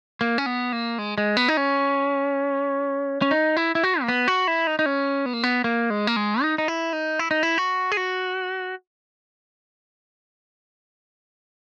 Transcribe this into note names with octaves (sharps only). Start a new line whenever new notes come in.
A#3
C#4
B3
A#3
G#3
G#3
B3
D#4
C#4
C#4
D#4
E4
E4
F#4
A#3
B3
F#4
E4
D#4
D#4
C#4
B3
A#3
B3
A#3
G#3
A#3
G#3
D#4
D#4
E4
D#4
E4
D#4
E4
F#4
G#4
F#4